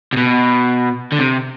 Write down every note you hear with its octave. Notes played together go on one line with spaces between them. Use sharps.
C3
B2
D3
C3